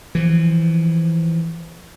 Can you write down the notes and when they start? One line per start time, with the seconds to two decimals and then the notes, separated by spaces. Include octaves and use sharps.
0.15 E3 F3